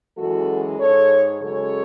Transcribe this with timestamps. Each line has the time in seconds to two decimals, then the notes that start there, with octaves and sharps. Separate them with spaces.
0.17 F#2 E3 G#3 F#4 A4
0.79 G#2 G#3 A4 C#5
1.41 F#2 C#3 G#3 A4 C#5